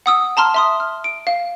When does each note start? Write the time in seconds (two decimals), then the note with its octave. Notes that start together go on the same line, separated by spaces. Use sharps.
0.06 F#5 D#6 E6
0.37 A5 A#5 C6 F6
0.54 E5 C6 D#6
0.80 F6
1.04 D7
1.27 F5